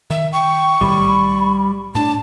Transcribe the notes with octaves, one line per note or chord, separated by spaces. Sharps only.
D#3 E5
G5 C#6
B1 A2 D#3 G3 B5
A2 D4 A5